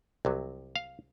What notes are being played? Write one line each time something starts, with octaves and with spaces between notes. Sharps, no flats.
C2 C3 F#3
F5